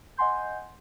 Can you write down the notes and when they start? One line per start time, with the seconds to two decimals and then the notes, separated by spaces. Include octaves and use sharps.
0.17 D#5 F#5 G#5 C6 G6